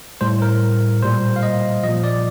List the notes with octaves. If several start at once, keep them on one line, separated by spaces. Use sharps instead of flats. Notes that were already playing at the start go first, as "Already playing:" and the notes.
A2 G3 C5
A#4
A#2 G3 C5
F5
D#5
A#2 F3 D#5
D5